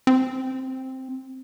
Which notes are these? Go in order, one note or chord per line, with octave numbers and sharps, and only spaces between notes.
C4